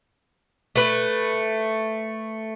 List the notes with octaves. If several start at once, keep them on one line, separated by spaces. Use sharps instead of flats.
A3 B4